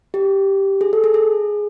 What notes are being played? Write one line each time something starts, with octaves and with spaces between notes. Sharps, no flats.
G4
G#4
A4
G#4
G#4